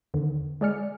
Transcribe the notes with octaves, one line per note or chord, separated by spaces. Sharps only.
E2 D3 D#3
G#3 G#4 D5 G#5 F6 C#7